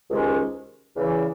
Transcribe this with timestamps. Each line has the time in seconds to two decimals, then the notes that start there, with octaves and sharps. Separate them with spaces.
0.10 C#2 C3 D#3 G#3 C#4
0.95 E2 C#3 E3